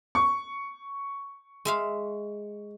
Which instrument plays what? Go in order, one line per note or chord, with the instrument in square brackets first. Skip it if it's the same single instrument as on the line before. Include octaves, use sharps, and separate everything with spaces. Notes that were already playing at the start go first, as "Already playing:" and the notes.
[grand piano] C#6
[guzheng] G#3 E5 F5